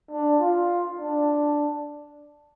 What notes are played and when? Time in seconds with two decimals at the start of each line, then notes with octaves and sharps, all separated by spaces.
0.11 D4
0.40 F4
0.99 D4